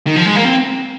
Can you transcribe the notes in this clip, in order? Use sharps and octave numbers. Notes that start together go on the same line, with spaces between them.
D#3
F3
G#3
A#3
C4